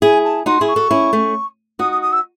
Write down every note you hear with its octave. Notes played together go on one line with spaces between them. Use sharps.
E4 G#4 G#5
A5
D#4 F#4 C6
E4 G#4
C#6
F#4 A4
C#4 E4
A3 C#4
D#4 F#4 D#6
D#6
D#6
E6